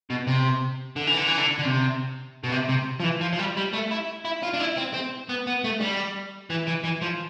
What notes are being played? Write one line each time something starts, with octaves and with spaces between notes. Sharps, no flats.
B2
C3
D3
E3
D3
E3
D3
D3
C3
B2
C3
C3
F3
E3
F3
F3
G3
G3
A3
E4
E4
F4
D4
E4
C4
C4
B3
B3
A3
G3
E3
E3
E3
F3